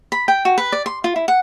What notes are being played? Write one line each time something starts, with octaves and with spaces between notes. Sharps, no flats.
B5
G5
F#4
B4
D5
C6
F4
E4
F#5